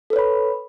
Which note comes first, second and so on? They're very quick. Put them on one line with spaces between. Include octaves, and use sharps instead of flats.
A4 B4 C#5 B5